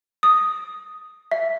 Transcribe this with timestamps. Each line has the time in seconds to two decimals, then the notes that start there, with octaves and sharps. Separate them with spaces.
0.23 D#6
1.31 E5